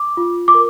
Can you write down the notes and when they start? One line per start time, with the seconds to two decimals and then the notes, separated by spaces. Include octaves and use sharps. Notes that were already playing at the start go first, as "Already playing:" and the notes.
Already playing: D6
0.17 F4
0.48 D6
0.54 A#4